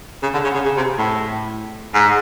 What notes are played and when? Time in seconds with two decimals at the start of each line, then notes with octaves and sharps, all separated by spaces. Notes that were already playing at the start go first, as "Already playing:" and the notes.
0.22 C#3
0.33 D3
0.44 C#3
0.55 C#3
0.65 C#3
0.77 C3
0.98 A2
1.94 G#2